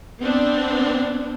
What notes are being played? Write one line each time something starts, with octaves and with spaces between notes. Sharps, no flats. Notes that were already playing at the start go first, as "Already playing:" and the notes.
B3 C4 D4